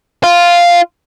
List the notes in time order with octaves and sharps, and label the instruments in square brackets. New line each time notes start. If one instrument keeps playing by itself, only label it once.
[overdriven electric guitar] F4